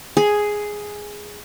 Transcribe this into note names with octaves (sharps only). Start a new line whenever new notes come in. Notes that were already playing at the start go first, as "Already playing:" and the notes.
G#4